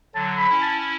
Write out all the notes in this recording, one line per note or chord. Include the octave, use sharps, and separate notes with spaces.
D3 F#3 A5
B5
C#4 E4
A5